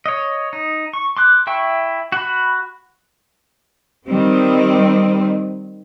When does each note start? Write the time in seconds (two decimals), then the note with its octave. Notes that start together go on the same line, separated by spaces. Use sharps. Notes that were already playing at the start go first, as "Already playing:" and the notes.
0.06 C#5 D#5
0.53 D#4
0.93 C#6
1.17 C6 D6 F#6
1.47 E4 E5 G5 C#6
2.12 F#4 B5
4.07 D#3 G3 C4